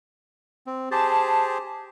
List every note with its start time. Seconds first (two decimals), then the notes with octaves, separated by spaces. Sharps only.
0.67 C4
0.91 G4 G#4 C5 A5